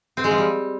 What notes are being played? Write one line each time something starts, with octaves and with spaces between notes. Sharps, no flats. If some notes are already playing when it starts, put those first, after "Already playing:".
C4
G#3
F3
G3